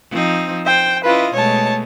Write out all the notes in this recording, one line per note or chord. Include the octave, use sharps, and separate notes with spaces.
F3 C4 D#4
C5 G5
C#4 E4 F4 B4 D#5
B2 G#3 A3 C#5 A5